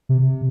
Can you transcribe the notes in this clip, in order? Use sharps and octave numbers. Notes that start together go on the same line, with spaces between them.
C3